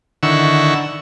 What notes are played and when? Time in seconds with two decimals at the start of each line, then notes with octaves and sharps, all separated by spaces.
0.23 D3 D#3 E4 F#5 C#6 E6